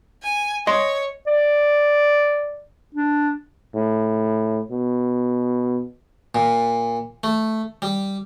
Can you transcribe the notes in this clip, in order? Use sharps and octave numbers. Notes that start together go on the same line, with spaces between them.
G#5
C#5 D#5 C6
D5
D4
A2
B2
A#2
A3
G3